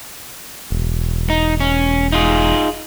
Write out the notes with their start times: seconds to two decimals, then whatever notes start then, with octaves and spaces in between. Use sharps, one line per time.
0.70 E1
1.30 D#4
1.60 C#4
2.12 D#4 F4 G#4